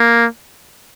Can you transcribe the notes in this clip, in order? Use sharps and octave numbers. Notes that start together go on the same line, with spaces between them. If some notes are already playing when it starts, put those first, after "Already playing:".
Already playing: A#3